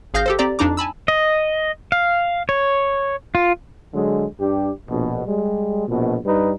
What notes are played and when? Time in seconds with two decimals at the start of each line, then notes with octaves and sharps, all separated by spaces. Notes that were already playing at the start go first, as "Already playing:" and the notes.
0.14 G#1 G#4 F5 F6 G6 A#6
0.26 G4 A4 C5
0.39 C4 G4 D5 A#5
0.59 F2 D4 D#4 A#5 D6
0.77 G#5 A5 B5 E6
1.08 D#5
1.92 F5
2.49 C#5
3.35 F4
3.94 D3 F#3 G#3
4.40 G2 D4 G4
4.89 A#1 B2
5.27 G3 G#3
5.88 A#1 B2
6.26 G2 G3 D#4 B4